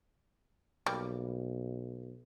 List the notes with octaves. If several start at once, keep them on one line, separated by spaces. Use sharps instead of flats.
B1 G3 A#3